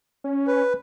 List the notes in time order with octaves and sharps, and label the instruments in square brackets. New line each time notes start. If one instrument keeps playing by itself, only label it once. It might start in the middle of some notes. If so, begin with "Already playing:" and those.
[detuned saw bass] C#4
[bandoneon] B4